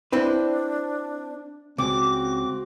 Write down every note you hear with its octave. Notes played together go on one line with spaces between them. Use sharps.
C4 D4 E4 B4
C#2 C4 F#4 D6